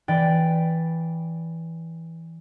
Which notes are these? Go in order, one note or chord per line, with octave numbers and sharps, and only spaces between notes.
E3 B4 D5 G5